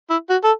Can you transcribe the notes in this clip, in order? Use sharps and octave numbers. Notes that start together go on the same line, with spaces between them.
E4
F#4
A4